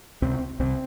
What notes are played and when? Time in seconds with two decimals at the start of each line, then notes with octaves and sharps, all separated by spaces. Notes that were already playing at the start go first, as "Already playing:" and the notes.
0.22 C#2 C3 C4
0.59 C2 C3 C4